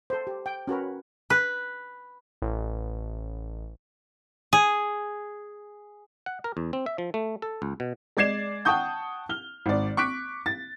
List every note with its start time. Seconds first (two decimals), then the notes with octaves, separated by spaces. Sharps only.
0.10 A4 C5
0.27 G4
0.46 G5
0.67 C#4 F#4 A#4 B4
1.30 B4
2.42 A1
4.53 G#4
6.26 F#5
6.44 A#4
6.57 E2
6.73 C4
6.86 E5
6.98 F3
7.14 A3
7.42 A4
7.62 C#2
7.80 B2
8.17 G#3 D5 G#6 C7 E7
8.65 F#5 G5 A5 C#6 D#6 G6
9.29 F6 G7
9.66 G#1 D5
9.97 C#6 D6 F#6 B6 D7
10.46 A6